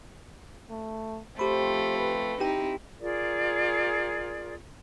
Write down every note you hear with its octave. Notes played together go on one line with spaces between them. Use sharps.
A3
F3 A3 C4 G4 C5 B5
B4
C4 D#4 E4 G4 G5
F4 G#4 A#4 D5